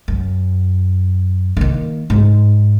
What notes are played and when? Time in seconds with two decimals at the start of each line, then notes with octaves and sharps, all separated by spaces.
0.08 F#2
1.57 D#3 A#3
2.10 G#2